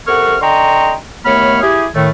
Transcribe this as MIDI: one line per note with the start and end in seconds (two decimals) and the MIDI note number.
0.08 0.36 48
0.08 0.36 69
0.08 0.36 70
0.08 0.36 78
0.08 0.36 85
0.08 0.36 89
0.41 0.94 50
0.41 0.94 75
0.41 0.94 79
0.41 0.94 82
0.41 0.94 84
0.41 0.94 85
1.26 1.59 39
1.26 1.59 57
1.26 1.59 59
1.26 1.59 73
1.26 1.59 83
1.26 1.59 89
1.62 1.86 64
1.62 1.86 67
1.62 1.86 68
1.95 2.10 45
1.95 2.10 51
1.95 2.10 57